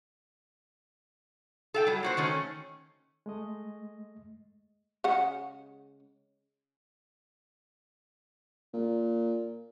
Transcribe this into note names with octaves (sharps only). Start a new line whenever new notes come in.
A4 F5 G5
F#3 G3
A#3 F#4 C5
D#3 A3 C#4
G#3 A3 D#5
C#3 G#3 F#5
A#2